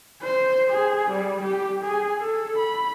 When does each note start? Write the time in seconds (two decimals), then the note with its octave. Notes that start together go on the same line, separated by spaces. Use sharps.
0.23 C5
0.70 G#4
1.10 G3
1.43 G4
1.83 G#4
2.20 A4
2.57 B5